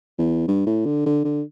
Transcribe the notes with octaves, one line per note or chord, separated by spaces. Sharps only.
E2
G2
A2
D3
D3
D3